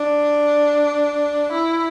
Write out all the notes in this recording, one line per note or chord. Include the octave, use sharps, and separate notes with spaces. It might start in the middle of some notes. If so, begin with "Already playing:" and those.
Already playing: D4
E4